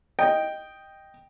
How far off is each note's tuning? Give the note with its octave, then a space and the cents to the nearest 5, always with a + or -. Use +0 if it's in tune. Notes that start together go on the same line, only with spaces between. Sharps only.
D#5 +0 G5 +0